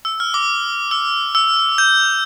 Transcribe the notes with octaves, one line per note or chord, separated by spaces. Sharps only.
E6
F6
D6
E6
E6
G6